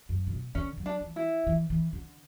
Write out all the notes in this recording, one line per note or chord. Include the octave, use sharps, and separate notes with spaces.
F#2
C#3
B2
D3 C#4
F#3
D4
E3
E4
E3
E3
D3